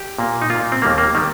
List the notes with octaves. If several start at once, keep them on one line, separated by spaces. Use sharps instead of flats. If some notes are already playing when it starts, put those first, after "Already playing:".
Already playing: G4
A#2 A#3
D#4
A#2 A#3 F4
C4
D#2 D#3 G3 A#3
A#3
D#3 G3 A#3